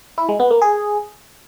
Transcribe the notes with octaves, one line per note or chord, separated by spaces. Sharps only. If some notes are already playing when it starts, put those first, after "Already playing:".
E4
G#3
B3
A#3
G#4